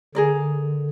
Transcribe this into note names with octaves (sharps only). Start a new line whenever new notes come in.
D3 G#4 A#4 D5